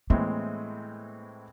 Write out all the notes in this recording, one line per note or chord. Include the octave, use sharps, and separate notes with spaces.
A2 E3 G#3 A#3 C4